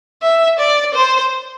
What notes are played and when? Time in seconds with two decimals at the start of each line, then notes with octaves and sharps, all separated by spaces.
0.23 E5
0.59 D5
0.94 C5